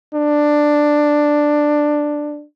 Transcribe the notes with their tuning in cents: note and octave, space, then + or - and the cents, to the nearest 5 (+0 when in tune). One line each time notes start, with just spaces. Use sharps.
D4 +10